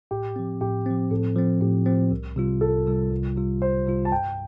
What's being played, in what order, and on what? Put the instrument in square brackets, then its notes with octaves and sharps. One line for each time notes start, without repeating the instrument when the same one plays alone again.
[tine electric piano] A2 [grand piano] G4
[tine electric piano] F3 C4
[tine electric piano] A2 [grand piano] G4
[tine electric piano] F3 C4
[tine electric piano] A2 [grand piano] A4
[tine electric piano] F3 C4
[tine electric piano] A2 [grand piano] G4
[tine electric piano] F3 C4
C2
C3 G3 F4
[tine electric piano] C2 [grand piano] A4
[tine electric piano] C3 G3 F4
C2
C3 G3 F4
[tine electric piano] C2 [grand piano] C5
[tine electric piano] C3 G3 F4
[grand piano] A5
[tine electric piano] G2 [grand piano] G5